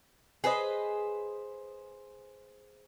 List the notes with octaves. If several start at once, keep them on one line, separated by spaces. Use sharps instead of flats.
G#4 B4 C5 D#5